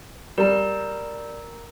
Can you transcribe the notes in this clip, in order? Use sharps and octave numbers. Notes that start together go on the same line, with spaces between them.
G3 A#4 A#5